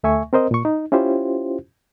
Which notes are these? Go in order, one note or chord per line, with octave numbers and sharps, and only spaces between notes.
D2 A3 E5 G#5 C#6
C4 A#4 C5 D#5
A#2 C#6
D#4
C#4 E4 F4 G4 C5